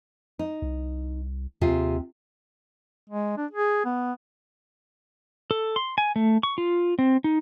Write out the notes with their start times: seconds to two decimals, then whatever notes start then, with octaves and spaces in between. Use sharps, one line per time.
0.39 D#4
0.62 C2
1.61 D#2 C3 F4 G#4
3.10 G#3
3.37 D4
3.51 G#4
3.85 B3
5.51 A4
5.76 C6
5.98 G#5
6.16 A3
6.43 C#6
6.58 F4
6.99 C4
7.24 D#4